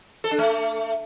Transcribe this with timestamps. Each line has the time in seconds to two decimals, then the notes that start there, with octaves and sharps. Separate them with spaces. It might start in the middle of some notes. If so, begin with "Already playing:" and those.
0.24 A4
0.31 D4
0.38 A3